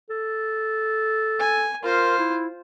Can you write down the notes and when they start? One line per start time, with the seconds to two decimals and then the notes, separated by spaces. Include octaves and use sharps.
0.10 A4
1.40 G#5
1.83 F4 A#4 C5
2.19 E4